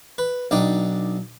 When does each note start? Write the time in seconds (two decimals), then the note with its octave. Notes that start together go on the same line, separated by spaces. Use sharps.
0.18 B4
0.51 B1 D4 D#4 G5